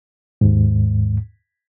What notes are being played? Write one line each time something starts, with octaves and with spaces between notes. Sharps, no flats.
D#2 G#2